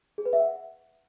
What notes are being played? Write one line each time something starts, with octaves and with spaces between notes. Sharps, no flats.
G#4
B4
E5
F#5